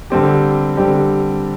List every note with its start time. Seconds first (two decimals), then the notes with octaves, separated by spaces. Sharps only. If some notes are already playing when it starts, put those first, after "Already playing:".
0.10 D3 G3 C4 G4
0.77 D3 G3 C4 G4